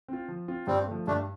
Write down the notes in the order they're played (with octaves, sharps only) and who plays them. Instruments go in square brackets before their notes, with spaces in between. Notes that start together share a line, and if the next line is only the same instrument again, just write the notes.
[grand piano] C4 F4
F3
C4 F4
[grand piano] G2 [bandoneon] G3 C4
[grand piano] F3 A3
[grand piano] G2 [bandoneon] A3 D4